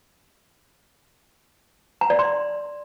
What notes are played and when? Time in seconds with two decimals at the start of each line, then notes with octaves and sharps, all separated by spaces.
2.01 A#5
2.10 D5
2.19 C6